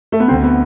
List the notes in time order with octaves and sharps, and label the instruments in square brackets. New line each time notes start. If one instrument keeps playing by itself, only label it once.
[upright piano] A3
B3
[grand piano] D2 D3 A3 [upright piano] C4
[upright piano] B3